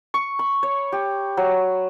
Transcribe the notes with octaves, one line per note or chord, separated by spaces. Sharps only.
C#6
B5
C#5
G4
F#3